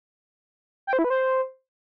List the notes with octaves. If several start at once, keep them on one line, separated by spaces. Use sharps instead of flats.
G5
C5
E4
B4
C5